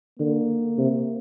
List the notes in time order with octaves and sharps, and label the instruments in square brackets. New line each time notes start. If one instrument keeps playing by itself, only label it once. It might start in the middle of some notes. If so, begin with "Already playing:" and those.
[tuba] D3 [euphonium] A#3
[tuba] C3